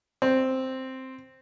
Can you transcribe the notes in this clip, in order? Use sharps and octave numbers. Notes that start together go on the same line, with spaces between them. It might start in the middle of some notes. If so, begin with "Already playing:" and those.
C4